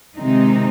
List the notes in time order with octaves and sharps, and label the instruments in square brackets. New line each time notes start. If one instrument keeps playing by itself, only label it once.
[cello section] C3 D#3 G#3 C4 D#4